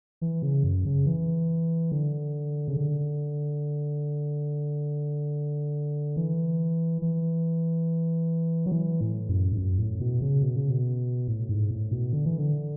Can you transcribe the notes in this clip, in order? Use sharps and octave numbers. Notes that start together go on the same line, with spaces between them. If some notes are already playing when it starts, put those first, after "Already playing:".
E3
C#3
F#2
C#3
E3
D3
C#3
D3
E3
E3
F#3
E3
A2
F#2
G#2
F#2
A2
B2
C#3
B2
C#3
B2
A2
G#2
A2
B2
D3
E3
D3